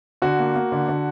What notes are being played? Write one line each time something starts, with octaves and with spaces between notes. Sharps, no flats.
D3 F#4
A#3
A#3
D3
D3